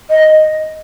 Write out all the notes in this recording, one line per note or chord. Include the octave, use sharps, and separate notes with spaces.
D#5